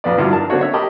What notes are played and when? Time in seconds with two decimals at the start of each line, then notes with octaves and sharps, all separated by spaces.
0.04 A#1 F2 B3 D5
0.17 D2 G2 F#3 E4 F4
0.31 D4 A#4 A5
0.50 D3 A#3 C4 D4 F#4 C#5
0.61 C#5 E5
0.74 G4 A#4 D#5 A5 B5 D6